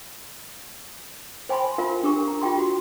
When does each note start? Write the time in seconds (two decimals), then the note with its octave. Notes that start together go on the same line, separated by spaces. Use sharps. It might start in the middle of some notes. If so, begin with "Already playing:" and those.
1.49 C5 G5 G#5 B5 C6
1.78 F4 A#4 F5
2.03 D4 G4 A#4 C#6
2.28 A#5
2.42 F4 G4 G5 C6
2.58 F#4